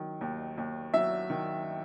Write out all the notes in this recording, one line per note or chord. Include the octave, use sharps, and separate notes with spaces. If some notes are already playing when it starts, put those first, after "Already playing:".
Already playing: D#3 F#3
D#2
D#2
F#3 E5
D#3